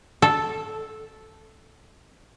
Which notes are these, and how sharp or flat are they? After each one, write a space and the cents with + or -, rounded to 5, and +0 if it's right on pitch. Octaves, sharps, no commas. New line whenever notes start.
A4 -5